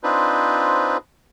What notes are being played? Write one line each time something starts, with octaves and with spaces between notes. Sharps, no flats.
C4 D4 D#4 F4 B4 C5